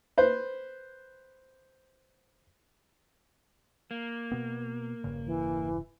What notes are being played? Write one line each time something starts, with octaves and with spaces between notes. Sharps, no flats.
B4 C5
A#3
B2 B3
E1 G2 C#3
E3